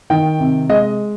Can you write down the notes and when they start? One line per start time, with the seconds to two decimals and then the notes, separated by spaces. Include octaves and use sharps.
0.10 D#3 G5
0.40 C3
0.69 G#3 D#5